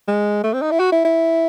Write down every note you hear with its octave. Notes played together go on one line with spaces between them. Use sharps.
G#3
A3
C4
D#4
E4
F#4
E4
E4